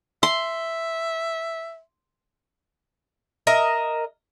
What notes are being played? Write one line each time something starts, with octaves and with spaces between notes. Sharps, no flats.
E5 C6
A#4 D#5 E5